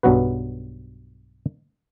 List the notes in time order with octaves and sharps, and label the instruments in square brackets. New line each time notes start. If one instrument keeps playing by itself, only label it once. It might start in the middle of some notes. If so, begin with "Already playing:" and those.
[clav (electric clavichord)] B1 G2 F#3 B3 F#4 B4